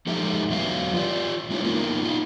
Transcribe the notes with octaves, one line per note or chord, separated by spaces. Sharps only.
F3 G#3 A3 D#4 G4 E5
E2 F#3 B3 F5
F4 G4 D5
G#3 C#4 D#4 E4 C#5
A#3 B3 D#4 F4 A#4
D#4 F4